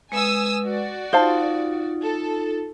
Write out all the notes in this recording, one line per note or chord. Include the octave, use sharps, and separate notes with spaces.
G#3 B4 G#5 D#6 E6
F#4 D5
D#4 F4 C5 F5 A5
A4